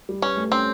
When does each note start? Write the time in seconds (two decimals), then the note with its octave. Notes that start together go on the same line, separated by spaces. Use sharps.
0.09 G3
0.22 C#4 B4
0.37 A3
0.52 C4 C#4